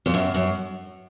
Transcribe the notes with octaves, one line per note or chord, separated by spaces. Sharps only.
F2
F#2
F#2